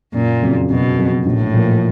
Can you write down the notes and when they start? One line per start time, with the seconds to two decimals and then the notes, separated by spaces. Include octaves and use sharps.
0.14 F#1 A#2
0.42 F2 C#3 F#3
0.70 F#1 B2
0.98 F2 C#3 F#3
1.26 A#1 A2
1.54 A#2 F3